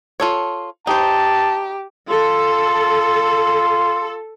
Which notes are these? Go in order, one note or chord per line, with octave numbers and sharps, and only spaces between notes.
F4 A4 C#5
D#4 G4 C5 A5
F4 A4